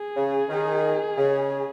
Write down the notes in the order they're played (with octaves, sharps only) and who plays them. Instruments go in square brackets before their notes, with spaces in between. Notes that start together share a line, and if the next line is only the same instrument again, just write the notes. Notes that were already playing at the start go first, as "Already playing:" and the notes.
Already playing: [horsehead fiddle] G#4
[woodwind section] C#3
D#3
C#3